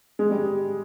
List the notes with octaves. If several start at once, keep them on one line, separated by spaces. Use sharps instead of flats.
G#3
G3